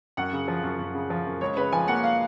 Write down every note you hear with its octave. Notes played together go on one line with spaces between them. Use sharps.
F#2 F#5
C#3
F3
F#2
F#2
C#3
F3
F#2
C#2 C#5
C#3 B4
F3 G#5
A#3 F#5
F5